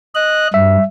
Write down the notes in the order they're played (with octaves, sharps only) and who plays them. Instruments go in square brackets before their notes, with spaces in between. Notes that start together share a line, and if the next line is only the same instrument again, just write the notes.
[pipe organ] D#5 F#6
[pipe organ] G2 [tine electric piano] E5